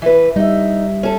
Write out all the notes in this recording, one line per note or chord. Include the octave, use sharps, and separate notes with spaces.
E3 B4
G3 D#4 E5
C#4 A4